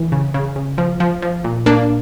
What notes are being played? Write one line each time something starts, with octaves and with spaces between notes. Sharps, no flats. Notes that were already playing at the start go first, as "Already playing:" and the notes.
Already playing: E3
C#3
C#3
C#3
F3
F3
F3
A#2
A#2 A#3 D4